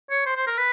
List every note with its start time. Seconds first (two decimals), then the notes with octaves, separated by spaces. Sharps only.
0.11 C#5
0.26 C5
0.36 C5
0.47 A#4
0.58 B4